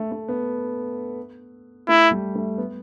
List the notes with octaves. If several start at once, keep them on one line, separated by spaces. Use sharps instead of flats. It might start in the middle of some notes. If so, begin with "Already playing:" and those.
Already playing: A3
A3
B3
A3 E4
G3
A3
B3